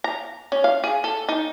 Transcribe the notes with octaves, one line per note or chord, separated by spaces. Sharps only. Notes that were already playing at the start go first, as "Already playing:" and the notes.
A#5
C#4
F5
G#4
A4
D#4